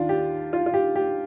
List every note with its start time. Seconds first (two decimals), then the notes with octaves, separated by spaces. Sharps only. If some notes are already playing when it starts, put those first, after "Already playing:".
Already playing: D#2 D#3 D4 F4
0.09 G4
0.53 F4
0.66 F4
0.74 G4
0.96 G4